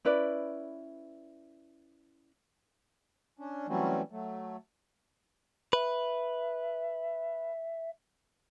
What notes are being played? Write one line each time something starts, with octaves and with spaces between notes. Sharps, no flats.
C#4 E4 B4 D5
C#4 D4
E3 F#3 G3 A3 C4 C#4
F#3 A3
B4 E5